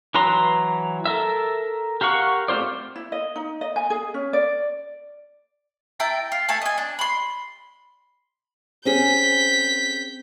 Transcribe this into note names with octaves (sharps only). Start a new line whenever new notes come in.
E3 F#3 B4 A#5 C6
A4 A#4 E5
G4 A#4 F5 F#5 C#6
A3 C4 F4 C5 D5
E4
D#5
D#4
D#5
G#5
G#4
C#4
D5
E4 G5 A5 A#5
F4
A3 G#5 A5
D#5 G#5
D4
B5 C6
C4 C#4 G#4 G6 B6